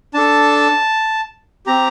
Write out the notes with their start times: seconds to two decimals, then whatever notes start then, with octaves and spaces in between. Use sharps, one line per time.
0.14 D4 A4 A5
1.66 C4 G4 A#5